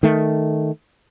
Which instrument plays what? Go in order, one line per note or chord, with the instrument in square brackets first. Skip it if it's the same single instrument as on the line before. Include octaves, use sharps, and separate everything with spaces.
[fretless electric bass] D#3 A3